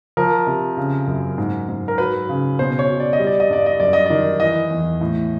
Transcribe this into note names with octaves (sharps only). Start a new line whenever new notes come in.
F3 A#4
C3
C#3
F#2
G#2
G#2
A#4
F#3 B4
C#3
B2 C5
C#5
B2
D5
D#5
G3
D5
D#5
G2 D5
D#5
F#2 D5
D#5
D#3 D5
E3 D#5
E2
A2